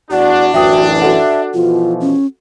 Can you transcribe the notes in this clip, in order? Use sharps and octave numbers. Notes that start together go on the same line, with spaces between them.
E2 D4 F#4 D5
A1 F#2 E3 F#4 E5 G5 D#6
F#4 A4 E5 F#5
B2 E3 F3 F4
C#4